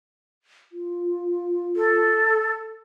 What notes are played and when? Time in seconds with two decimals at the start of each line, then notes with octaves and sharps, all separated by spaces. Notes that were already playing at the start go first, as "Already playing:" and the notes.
0.72 F4
1.76 A4